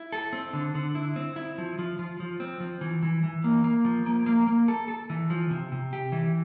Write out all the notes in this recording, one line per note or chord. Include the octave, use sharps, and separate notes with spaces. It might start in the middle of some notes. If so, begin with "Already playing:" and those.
Already playing: E4
A4
C4
D3
D3
E4
C4
E4
F3
F3
F3
F3
C4
F3
E3
E3
E3
A#3
A#3
F3
A#3
A#3
A#3
A4
A4
E3
F3
C3
C3
G4
E3